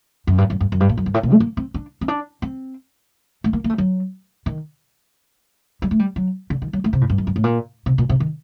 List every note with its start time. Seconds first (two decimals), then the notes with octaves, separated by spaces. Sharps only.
0.27 F#2
0.38 G2
0.50 F#2
0.60 G2
0.72 F#2
0.80 G2
0.89 A#2
0.97 F#2
1.06 G2
1.14 A2
1.23 A#2
1.32 A3
1.40 A#3
1.57 C4
1.74 D4
2.01 C4
2.08 D4
2.42 C4
3.44 A3
3.53 A#3
3.64 A#3
3.70 A3
3.78 F#3
4.46 D#3
5.82 G3
5.91 A3
5.99 G3
6.16 F#3
6.50 D3
6.62 D#3
6.73 F#3
6.84 A3
6.93 C3
7.01 A2
7.10 G2
7.18 F#2
7.27 G2
7.36 A2
7.44 A#2
7.86 C3
7.98 A#2
8.09 C3
8.20 D#3